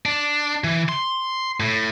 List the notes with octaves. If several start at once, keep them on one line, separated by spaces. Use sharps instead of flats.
D4
E3
C6
A2